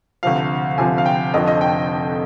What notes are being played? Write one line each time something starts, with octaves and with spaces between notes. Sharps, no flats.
D2 C3 F3 F5
D2 C3 F3 G#5
F5
G5
F1 F2 D3 F3 D#5
D#5
G5